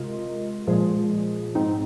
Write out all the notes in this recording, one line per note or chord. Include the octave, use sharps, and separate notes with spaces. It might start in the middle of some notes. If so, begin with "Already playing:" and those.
Already playing: C3 G#3 F4 A#4 D#5
A#2 F3 G#3 F4 G#4
G#2 G#3 C4 D#4